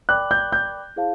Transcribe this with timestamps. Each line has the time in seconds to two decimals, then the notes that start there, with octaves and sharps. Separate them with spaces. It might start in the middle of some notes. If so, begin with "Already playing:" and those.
0.09 A#4 D5 G5 B5 D6 F#6
0.31 G6
0.52 G6
0.96 E4 G#4 C5 F5 A5